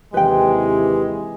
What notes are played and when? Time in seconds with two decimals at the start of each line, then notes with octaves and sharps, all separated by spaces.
0.14 D#2 C3 E3 G#3 G4 B4 G5